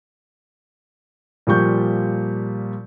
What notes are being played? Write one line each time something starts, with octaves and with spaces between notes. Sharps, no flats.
A#2 F3 G3 C#6 G6